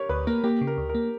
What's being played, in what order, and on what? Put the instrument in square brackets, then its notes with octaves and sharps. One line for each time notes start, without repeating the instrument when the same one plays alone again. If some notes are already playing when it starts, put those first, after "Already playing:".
Already playing: [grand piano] G4 A#4 C#5
[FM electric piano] D2 [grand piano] B4
[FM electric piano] A#3 [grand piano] A#4
[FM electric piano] A#3 [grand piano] G4
[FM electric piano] C#3
[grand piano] A#4
[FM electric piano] D2
[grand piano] A#4
[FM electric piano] A#3